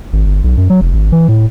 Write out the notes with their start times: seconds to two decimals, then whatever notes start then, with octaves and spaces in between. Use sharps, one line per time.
0.13 G#1
0.26 G1
0.44 B1
0.57 F#2
0.70 F#3
0.81 F1
0.94 G#1
1.12 E3
1.28 A2